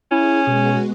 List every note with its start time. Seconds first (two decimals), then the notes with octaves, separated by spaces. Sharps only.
0.11 C#4 E4 G#4
0.47 B2 G#3 B3 F#4